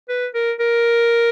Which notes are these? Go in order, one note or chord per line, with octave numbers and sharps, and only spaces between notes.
B4
A#4
A#4